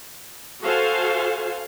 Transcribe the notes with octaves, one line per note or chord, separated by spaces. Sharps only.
F#4 A4 C5 F5 G#5